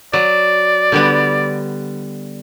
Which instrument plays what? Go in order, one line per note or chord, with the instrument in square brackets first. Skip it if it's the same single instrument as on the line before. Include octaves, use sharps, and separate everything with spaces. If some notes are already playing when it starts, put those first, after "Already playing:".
[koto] F#3 [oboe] D5
[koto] D3 G3 B3